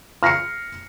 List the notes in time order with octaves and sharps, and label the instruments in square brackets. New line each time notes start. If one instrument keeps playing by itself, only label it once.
[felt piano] F6 A#6 C7 C#7